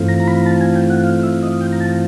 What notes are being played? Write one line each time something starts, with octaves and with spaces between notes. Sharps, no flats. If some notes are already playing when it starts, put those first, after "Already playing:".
Already playing: G2 E3 A3 C4 F4
A#5
A#5
B5
A5
G#5
G5
F#5
F5
E5
D#5
G5
A#5
A5